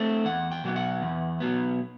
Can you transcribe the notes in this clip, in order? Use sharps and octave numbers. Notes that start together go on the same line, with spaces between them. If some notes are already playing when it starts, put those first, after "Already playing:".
Already playing: A3 C4
E2 F#5
G5
B2 F#3 B3
F#5
E2
B2 F#3 B3